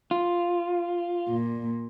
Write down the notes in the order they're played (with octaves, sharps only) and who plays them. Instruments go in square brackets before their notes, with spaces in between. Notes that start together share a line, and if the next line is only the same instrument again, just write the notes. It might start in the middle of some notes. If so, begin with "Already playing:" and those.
[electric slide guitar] F4
[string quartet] A#2